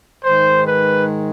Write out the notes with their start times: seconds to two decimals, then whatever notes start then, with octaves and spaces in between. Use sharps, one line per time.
0.22 G#2 D#3 G#3 C5
0.66 B4